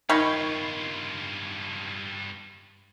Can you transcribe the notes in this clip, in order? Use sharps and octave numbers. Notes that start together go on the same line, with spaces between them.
G2 D#3 F4 B5 C#6 G#6